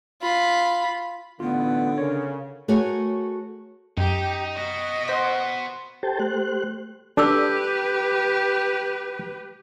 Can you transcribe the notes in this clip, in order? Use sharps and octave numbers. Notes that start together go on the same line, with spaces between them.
F4 B5
A1 D3 A3 B3 F4
C#3 A#4 C#5
A3 F#4 G#4 A#4 C#5 G#5
F#2 D#4 G4
B3 F#4 D#5
C5 F#5 C6 B6
G4 A4 C5 G5 A5
A3 G4 C5 F#6
D4 G4 A4 B4 D6 E6